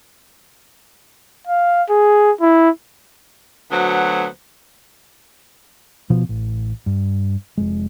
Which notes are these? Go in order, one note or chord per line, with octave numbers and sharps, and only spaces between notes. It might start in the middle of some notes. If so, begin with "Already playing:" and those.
F5
G#4
E4
D2 F#3 B3 C5 F#5
B2 F3 B3
A1
G2
F1 G#3